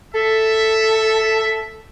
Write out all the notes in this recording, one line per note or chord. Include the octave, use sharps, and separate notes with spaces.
A4 E5